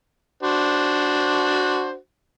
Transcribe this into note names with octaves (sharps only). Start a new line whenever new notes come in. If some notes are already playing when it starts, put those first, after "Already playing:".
D4 F#4 C5